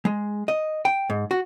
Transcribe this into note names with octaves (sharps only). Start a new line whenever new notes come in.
G#3
D#5
G5
G#2
F#4